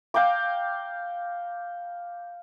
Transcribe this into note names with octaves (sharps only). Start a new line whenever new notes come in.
F5 G5 A#5 D6